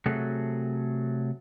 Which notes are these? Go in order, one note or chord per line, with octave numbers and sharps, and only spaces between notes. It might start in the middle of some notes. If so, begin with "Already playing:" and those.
C3 F#3 A3 F#4 G#4 A4